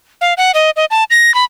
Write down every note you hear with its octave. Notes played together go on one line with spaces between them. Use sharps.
F5
F#5
D#5
D#5
A5
A#6
B5